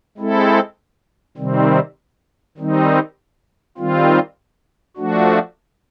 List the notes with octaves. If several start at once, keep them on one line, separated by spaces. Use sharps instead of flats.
G#3 C4 E4 A4
C3 D#3 G3 C4
D#3 G3 C4 D#4
D#3 G3 C4 F4
F3 A3 D4 F#4